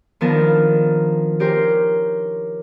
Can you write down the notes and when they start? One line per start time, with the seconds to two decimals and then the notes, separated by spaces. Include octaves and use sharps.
0.21 D#3 F3 B3 D4 A#4 A5
1.39 C#4 G4 A#4 C5